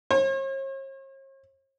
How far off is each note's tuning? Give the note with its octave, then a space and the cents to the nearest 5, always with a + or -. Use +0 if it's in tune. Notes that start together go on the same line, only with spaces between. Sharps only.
C#5 -45